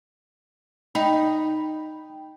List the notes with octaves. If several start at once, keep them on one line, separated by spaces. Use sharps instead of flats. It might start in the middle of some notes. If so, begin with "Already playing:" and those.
D#4 G5 B5